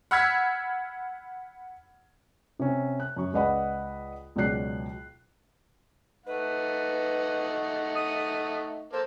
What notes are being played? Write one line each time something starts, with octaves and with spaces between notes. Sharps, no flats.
F#5 B5 E6 F6 G#6 B6
C3 C#4
F#6
F#2 C#6
C#2 B4 D5 D#5 F#5 B5
C#2 B2 F#3 D5 F#6 C7
A3 D#4 B4 F#5
D#6
A#3 A4 A#4 C5